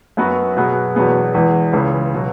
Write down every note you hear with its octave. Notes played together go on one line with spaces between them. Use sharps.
F#2 F#3 B3 F#4 B4
B2 F#3 B3 G#4
E2 B2 F#3 B3 G#4
E2 E3 G#3
C#2 C#3 E3
B2 F#3